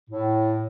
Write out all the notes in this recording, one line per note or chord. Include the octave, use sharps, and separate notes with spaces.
A2